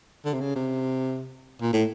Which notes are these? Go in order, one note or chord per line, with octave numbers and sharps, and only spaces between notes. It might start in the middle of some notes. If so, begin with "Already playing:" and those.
D3
C3
C#3
C3
A#2
A2